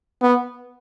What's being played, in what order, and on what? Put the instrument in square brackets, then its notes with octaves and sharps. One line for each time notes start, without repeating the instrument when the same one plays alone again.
[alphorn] B3